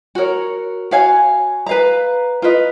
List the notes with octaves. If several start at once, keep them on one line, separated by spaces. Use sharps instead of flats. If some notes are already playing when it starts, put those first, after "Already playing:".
F#4 A#4 C#5
F#4 C#5 F5 G#5
B4 F5 A#5
F4 B4 D#5